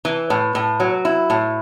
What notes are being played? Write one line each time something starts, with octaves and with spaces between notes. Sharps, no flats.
E3
A2
A2
F#3
E4
A2